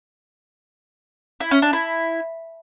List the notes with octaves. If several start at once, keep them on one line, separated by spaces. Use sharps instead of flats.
E4
C#4
D4
E4